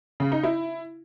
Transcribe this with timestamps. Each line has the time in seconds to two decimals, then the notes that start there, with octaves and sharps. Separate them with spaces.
0.20 C#3
0.32 D#4
0.43 E4